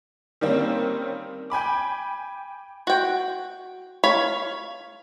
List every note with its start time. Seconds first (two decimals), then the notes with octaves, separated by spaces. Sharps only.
0.41 D#3 G3 A#3 C4 C#4
1.50 G5 G#5 B5 D6
2.87 F#4 G5
4.04 C#5 F5 B5